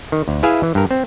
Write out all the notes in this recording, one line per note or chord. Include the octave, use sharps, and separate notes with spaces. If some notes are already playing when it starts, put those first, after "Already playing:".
D#3
D2
E4 G#4 B4 E5 F5 G#5
E3
G2 A#4
C4